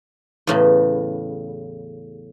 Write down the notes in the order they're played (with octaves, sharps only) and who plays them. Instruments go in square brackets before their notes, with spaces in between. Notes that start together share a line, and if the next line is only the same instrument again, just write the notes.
[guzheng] E2 A2 C#3